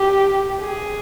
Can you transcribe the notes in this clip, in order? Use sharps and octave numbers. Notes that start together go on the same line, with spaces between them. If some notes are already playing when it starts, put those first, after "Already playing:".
Already playing: G4
G#4